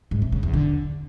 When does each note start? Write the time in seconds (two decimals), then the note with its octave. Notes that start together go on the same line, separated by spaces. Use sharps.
0.11 G#2
0.22 C3
0.32 C#3
0.43 E2
0.54 D3